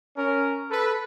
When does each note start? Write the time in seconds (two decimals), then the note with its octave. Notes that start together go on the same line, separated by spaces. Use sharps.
0.17 C#4 A#4
0.71 A4 B4